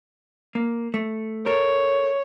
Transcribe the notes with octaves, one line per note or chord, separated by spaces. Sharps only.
A#3
A3
A4 A#4 C#5